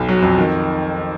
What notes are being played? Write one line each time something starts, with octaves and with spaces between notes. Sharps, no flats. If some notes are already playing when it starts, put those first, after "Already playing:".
Already playing: B1
F#3
F2
D#3